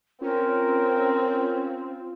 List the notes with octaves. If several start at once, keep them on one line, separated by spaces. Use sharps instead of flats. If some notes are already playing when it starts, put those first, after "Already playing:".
C4 C#4 F4 A#4